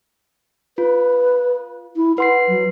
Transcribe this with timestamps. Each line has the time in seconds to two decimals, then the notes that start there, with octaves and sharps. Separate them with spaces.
0.78 F4 B4
1.96 E4
2.18 B4 F#5 C6 C7
2.48 F#3